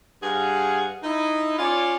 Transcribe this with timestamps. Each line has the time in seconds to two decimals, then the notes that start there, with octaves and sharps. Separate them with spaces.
0.22 G2 G#4 F5 F#5
1.04 D#4 E4
1.59 C#4 F4 C#5 D5